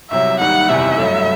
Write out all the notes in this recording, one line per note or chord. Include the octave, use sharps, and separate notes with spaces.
C2 C3 F#3 E5
D#2 D#3 G3 D#4 F#5
F#1 E2 C3 D#3 E5
G2 F#3 A3